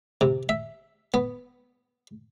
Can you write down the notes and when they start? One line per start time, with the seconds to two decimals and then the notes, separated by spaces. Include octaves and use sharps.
0.21 C3
0.49 E5
1.14 B3